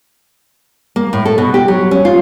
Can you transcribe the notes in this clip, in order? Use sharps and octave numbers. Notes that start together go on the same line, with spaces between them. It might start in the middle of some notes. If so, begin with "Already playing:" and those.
A#3
A2
A4
B2
G4
F#3
C#4
F4